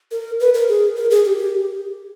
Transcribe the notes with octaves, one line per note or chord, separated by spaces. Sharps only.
A#4
B4
A#4
G#4
A#4
G#4
G4
G4